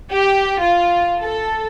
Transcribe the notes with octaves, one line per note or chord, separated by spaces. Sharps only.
G4
F4
A4